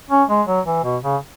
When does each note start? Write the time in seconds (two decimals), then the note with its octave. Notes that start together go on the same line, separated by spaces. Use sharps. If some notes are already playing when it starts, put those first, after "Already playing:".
0.10 C#4
0.29 G#3
0.47 F#3
0.66 E3
0.84 B2
1.03 C#3